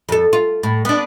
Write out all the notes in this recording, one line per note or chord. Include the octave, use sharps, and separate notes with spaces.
F2 A4
F4
A2
B3 D4